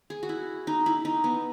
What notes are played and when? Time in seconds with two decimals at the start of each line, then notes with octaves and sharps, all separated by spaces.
0.10 G#4
0.23 F#4
0.29 E4
0.67 D#4
0.86 E4
1.05 D#4
1.24 B3